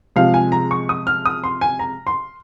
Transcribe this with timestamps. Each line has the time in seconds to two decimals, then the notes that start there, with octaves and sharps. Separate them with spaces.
0.16 C3 F3 G#3 F5
0.34 G#5
0.52 A#5
0.71 C#6
0.89 D#6
1.07 F6
1.26 D#6
1.44 C6
1.61 G#5
1.79 A#5
2.07 C6